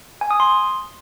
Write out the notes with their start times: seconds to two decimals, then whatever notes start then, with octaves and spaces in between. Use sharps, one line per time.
0.21 G#5
0.31 D#6
0.40 C6